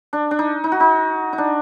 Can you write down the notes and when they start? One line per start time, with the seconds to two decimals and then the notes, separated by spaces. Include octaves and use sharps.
0.13 D4
0.31 D4
0.39 D#4
0.64 D#4
0.72 F#4
0.80 D#4
1.33 D#4
1.38 D4